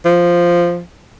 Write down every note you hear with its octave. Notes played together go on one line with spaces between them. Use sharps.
F3